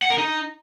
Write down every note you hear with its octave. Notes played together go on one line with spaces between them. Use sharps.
F#5
A#4
D#4